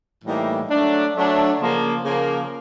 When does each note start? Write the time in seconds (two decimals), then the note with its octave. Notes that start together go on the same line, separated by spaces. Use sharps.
0.24 A2 E3 G3 A#3 D#4
0.70 F#3 A3 D4
1.15 F#3 A3 D4
1.59 C#3 F3 A#3
2.05 C#3 F3 A#3